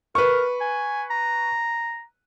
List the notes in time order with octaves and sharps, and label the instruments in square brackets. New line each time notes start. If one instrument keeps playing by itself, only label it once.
[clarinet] A#4 [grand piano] B4 C#6
[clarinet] G#5
A#5